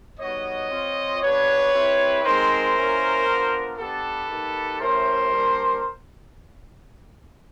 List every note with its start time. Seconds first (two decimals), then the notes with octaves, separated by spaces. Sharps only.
0.19 G3 B3 D#4 F#4 C#5 D#5
0.70 C4 F4
1.21 B3 D4 G4 B4 C#5
1.73 C4 E4 G4
2.23 G#3 C4 D#4 A#4 C5
2.74 A#3 C#4 E4
3.26 B3 D4 F4
3.77 B3 D4 G4 A4 B4
4.28 A#3 D#4 G4
4.79 A3 C#4 E4 G4 A#4 C5
5.31 G3 A#3 D4